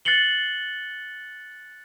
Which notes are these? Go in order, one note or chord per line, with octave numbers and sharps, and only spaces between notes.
F#6 A6 C7 C#7 F#7 G7